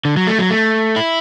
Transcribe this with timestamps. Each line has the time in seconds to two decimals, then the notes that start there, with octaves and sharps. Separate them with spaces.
0.05 D3
0.17 F#3
0.27 A3
0.39 F#3
0.50 A3
0.96 E4